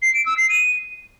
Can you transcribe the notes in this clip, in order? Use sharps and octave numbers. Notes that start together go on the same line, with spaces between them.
C7
D7
E6
C7
D#7